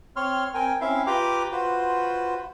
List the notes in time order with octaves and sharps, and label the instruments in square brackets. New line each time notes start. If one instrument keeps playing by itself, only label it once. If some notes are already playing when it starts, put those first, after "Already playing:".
[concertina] C4 C#5 C6 F6
C4 A#4 G5 G#5
C4 C#4 E4 E5 F5
F4 G4 B4 G5 A#5 D6
F4 F#4 B4 C5